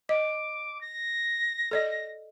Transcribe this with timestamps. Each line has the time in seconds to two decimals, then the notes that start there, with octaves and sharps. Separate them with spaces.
0.09 D#5 D6
0.81 A#6
1.71 A4 D5 D#5